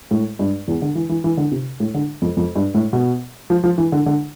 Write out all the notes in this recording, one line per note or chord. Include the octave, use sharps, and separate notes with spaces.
A2
G2
E2
D3
E3
E3
E3
D3
C3
A2
D3
F2
F2
G2
A2
B2
F3
F3
E3
D3
D3